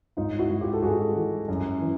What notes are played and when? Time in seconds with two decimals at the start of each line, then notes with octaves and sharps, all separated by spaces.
0.17 G#2 D#4 F4
0.39 E4 F#4
0.50 G#2
0.61 F4 G4
0.73 A4
0.82 G#2 F#4 G#4
1.16 E3
1.48 F#2
1.81 E3